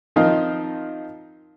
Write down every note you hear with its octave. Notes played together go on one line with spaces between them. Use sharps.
D#3 F3 C4 D#4 F4